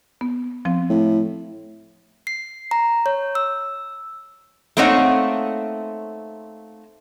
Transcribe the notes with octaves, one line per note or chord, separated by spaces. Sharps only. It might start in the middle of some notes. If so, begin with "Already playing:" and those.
B3
F3 C4
A2
C7
A#5
C#5
E6
A3 A#3 C4 D#4 C#5 F#5